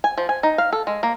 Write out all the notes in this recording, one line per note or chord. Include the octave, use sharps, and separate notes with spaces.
G#5
F3
G#5
D#4
F5
A4
G#3
A#3